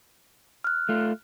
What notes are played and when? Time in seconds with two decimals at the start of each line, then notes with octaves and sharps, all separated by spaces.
0.64 F6 F#6
0.89 A3 F4